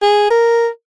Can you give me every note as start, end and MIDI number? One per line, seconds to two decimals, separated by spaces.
0.02 0.29 68
0.30 0.67 70